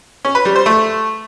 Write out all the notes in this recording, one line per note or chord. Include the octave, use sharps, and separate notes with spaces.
C#4
B4
G3
C5
A3